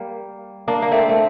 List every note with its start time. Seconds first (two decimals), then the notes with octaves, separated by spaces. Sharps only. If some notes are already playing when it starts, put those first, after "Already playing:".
Already playing: G3 A#3
0.68 A#3 D4
0.82 A#3
0.92 A3 C4
1.09 A3